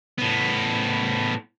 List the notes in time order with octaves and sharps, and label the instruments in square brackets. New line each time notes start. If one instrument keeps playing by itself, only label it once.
[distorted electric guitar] A2 B3